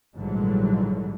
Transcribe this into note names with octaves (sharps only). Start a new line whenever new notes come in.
A#1 G#2 D3 E3 F#3 G3